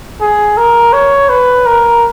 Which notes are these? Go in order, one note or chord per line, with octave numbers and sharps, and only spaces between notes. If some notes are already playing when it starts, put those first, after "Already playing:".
G#4
A#4
C#5
B4
A#4